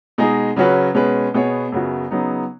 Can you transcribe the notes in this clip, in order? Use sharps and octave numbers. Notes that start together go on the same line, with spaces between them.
B2 G#3 D#4 G#4
C#3 F#3 C#4 F#4 B4
B2 G#3 C#4 G#4 B4
B2 B3 G#4 C#5
F#2 C#3 B3 F#4
C#3 F#3 B3 D#4